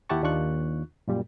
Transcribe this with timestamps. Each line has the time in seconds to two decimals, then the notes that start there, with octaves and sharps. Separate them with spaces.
0.09 D#2 E4 G4 F#5 A5 C#6
0.23 D#2 D4 F4 C#6 F#6
1.08 F#2 A#2 G3